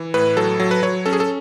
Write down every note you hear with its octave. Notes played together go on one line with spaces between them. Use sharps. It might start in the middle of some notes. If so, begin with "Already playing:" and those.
Already playing: E3
A2 B4
F#3 A4
F#3
B4
F#3 C#5
C#4 A4
G#4
A4